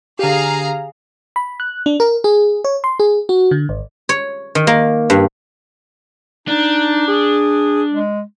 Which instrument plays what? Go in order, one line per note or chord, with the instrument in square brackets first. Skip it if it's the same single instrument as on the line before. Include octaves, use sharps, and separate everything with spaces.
[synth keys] D3 G4 [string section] G#4 F5 A#5
[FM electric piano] B5
F#6
D4
A#4
G#4
C#5
C6
G#4
F#4
D3
G#1
[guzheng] C#5
D#3
A#3
G2
[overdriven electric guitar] D4 [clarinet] D#4
[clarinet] G#4
G#3